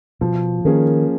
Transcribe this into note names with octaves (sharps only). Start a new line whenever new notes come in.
B2 F3
D#3 A#3 C#4 G#4